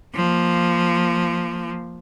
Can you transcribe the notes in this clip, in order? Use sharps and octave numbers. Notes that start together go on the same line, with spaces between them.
F3 A#3